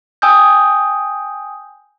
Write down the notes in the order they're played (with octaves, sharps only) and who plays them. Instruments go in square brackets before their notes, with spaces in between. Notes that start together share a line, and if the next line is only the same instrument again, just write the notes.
[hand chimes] G5 G#5 D#6 E6 G6